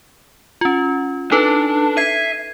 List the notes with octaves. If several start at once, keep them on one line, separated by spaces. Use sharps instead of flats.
C#4 F4
D4 D#4 A4 B4
E5 G#6 C7 D#7